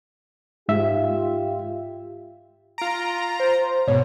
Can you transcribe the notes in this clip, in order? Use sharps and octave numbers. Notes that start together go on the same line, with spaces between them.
G#2 F4 G4 E5
F4 A#5 D7
C5
G#2 B2 C#5